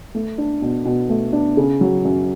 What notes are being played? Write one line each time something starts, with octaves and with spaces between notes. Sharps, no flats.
A3
D4
B2
B2
A3
D4
C#3
F#3
F#2